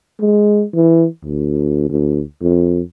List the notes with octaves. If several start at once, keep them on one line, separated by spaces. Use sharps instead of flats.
G#3
E3
D2
D2
F2